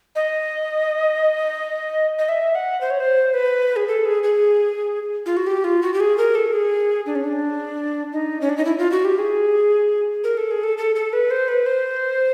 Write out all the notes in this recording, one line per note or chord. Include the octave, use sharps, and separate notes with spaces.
D#5
D#5
E5
F#5
C5
C#5
C5
B4
G#4
A4
G#4
G#4
F4
F#4
G4
F4
F#4
G4
G#4
A#4
A4
G#4
D4
C#4
D4
D#4
C#4
D4
D#4
E4
F4
F#4
G4
G#4
A#4
A4
G#4
A4
A4
A4
B4
C5
B4
C5